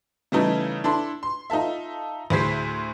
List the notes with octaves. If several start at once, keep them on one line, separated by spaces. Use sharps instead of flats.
C#3 E3 G3 A3 D#4 E4
D4 E4 A4 C6
C6
D#4 F4 A4 E5
D2 A2 G#4 C5 B6 C7